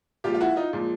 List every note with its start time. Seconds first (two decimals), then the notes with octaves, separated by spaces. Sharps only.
0.24 A#2 F3 G#3 F4 G4
0.34 F4
0.41 E4 F#4
0.56 D#4 F4
0.73 A#2 F3 G#3